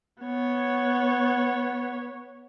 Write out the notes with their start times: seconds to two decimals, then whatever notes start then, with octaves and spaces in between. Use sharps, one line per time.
0.23 B3 C#5